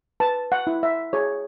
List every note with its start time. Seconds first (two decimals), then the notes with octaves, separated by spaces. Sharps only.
0.20 B4 A5
0.52 F#5
0.67 E4
0.83 E5
1.13 G#4 C#5